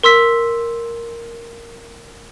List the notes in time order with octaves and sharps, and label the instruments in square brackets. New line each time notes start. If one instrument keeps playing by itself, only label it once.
[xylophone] A#4 C6 E6 B6